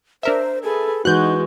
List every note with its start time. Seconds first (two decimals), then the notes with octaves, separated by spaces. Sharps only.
0.23 D4 A#4 C5 E5
0.63 G#4 A4 B4
1.05 E3 G#3 D#4 F#4 F#6 G6